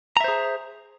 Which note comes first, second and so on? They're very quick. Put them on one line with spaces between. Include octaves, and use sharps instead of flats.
A#5 E5 C5 G#4